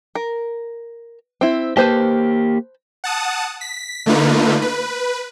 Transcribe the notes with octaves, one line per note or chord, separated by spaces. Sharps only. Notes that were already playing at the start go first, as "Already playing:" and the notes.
A#4
C4 E4
A#3 G4 B4 C5 A5
F#5 A5 D#6
B6
D3 A3 A#3 D#4 F4 B4
B4